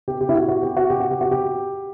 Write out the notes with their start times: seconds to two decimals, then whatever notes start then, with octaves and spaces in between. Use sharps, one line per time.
0.08 G4
0.21 G4
0.29 E4
0.35 F#4
0.49 F#4
0.63 G4
0.77 F#4
0.90 G4
1.00 F#4
1.11 G4
1.21 F#4
1.31 G4